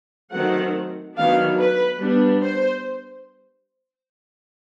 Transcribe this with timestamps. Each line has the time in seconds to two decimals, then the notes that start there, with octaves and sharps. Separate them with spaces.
0.32 D#3 F#3 A3 C4 F#5
1.16 D#3 F#3 B3 D4 F5
1.58 B4
2.00 G3 B3 D4
2.42 C5